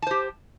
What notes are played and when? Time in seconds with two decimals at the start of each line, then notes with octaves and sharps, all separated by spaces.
0.02 A5
0.07 C5
0.11 G4